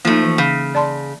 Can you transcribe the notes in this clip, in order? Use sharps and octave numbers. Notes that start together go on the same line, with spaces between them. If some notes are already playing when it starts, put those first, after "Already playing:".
F3 A3 A#3 D#4
E3
C#3
D5 A5 C6